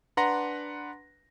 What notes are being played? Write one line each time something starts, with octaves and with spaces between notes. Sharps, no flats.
D4 B4 F#5 A#5 C6 A#6